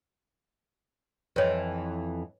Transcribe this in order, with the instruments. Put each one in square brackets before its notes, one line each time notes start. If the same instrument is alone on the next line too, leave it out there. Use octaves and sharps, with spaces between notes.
[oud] F2 E3 [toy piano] B4 C#5 D#5